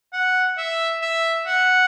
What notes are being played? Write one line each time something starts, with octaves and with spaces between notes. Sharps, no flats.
F#5
E5
E5
F#5